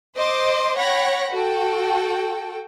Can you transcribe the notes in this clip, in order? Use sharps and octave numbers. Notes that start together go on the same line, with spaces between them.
C5 D#5 C6 D6
C#5 F#5 G5 B5 A#6
F#4 A4 G5